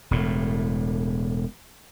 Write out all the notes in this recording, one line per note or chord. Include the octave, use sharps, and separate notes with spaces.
E1 A2